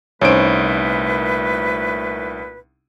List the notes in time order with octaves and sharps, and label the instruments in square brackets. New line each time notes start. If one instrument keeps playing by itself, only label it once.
[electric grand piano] C2 D7 [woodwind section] A#2 A3 B4 [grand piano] C#4 D#4 C5